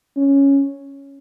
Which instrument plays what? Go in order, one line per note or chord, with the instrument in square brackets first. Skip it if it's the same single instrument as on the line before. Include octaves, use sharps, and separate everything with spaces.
[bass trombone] C#4